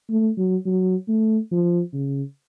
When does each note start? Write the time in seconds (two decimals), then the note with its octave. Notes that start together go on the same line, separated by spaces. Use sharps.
0.10 A3
0.37 F#3
0.66 F#3
1.08 A3
1.51 F3
1.93 C#3